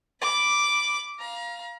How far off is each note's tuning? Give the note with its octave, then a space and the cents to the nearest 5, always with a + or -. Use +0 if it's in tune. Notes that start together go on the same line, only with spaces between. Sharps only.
B5 +0 D6 +0
F5 +0 A#5 +35